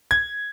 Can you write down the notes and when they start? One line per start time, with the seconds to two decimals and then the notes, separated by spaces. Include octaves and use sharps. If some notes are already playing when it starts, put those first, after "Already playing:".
0.11 G#6